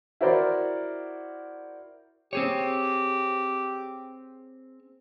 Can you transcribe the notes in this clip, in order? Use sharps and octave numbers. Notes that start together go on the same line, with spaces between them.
E4 F#4 A#4 C5 D5
C4 G4 G#4 C#5